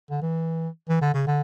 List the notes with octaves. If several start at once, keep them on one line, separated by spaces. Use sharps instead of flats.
D3
E3
E3
D3
C#3
D3